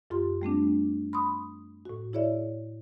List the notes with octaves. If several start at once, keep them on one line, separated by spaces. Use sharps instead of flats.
F#2 F4 G4 C6
G3 A3 C4 D4
B5 C6 D#6
A2 F#4
E4 G#4 C#5 D5 E5